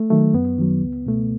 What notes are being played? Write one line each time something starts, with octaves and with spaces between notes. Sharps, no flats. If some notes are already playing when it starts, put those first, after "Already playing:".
Already playing: A3
D#3 F#3 A3
F#2 B3
D#3 F#3
C#2
B2 A3